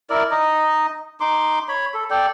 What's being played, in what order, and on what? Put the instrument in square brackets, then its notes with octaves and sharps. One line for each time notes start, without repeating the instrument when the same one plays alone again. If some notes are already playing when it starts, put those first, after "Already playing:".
[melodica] E4 A#4 D5
D#4 D#5
D#4 C6 D6
C#5 B5
A4
A4 D5 G5